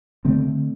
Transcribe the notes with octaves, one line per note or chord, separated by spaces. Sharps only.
D3 A3 C4
D3